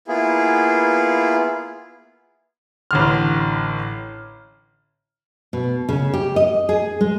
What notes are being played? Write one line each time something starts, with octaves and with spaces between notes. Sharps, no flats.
A#3 B3 E4 F4 G#4
A1 D3 F6
B2
C#3
G4
D#5
G#4
G#3